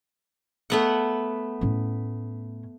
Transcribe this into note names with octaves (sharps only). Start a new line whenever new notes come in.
A3 B3 F#5
A2 C#4